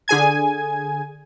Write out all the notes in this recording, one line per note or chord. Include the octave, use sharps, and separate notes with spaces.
D3 G#4 G#5 G#6